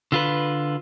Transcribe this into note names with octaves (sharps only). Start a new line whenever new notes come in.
D3 F4 B4